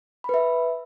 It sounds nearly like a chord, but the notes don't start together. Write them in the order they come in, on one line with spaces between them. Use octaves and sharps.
B5 B4 E5